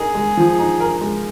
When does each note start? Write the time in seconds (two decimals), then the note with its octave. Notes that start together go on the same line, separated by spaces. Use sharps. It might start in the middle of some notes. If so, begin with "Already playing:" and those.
Already playing: D#4 G#4 A#4
0.15 G#3
0.37 F3
0.59 D#4
0.80 A#4
1.01 G#3